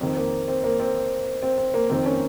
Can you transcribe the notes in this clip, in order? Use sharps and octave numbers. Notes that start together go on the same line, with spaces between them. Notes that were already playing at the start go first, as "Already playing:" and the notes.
F2 D#3 C4
A#3
C4
A#3
C4
C4
C4
A#3
F2 D#3 C4
A#3 C#4